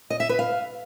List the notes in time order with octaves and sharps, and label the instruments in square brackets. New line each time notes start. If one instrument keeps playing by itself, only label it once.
[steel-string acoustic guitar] D#5
E5
B4
F5